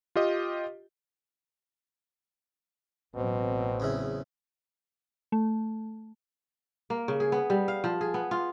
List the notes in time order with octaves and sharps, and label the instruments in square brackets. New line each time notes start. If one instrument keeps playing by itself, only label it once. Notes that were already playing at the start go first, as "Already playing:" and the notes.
[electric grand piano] F4 G4 D#5
[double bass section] A1 F#3 C4 [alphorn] B2
[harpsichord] E2 C#3 E4
[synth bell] A3
[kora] A#3
C#3
G#4
B3
G3
F5
F3
G#4
B3
F4